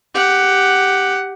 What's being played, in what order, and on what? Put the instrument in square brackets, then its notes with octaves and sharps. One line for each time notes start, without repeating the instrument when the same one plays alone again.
[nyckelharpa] G4 F#5